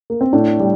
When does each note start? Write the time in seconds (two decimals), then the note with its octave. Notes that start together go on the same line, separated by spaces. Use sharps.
0.10 A#3
0.21 C4
0.33 A2 D4
0.60 G3